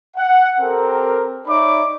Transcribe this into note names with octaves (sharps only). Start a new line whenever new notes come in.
F#5
C4 G4 A4 A#4
D#4 C#5 D5 E5 B5 D6